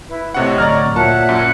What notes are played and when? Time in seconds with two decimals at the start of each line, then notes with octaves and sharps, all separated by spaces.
0.08 E4 B4
0.34 A2 C3 C#5 D#5 F#5 C#6
0.58 D1 D5 A#5 F6
0.96 A#2 F#4 C#5 E5 F#5 A5
1.29 F#2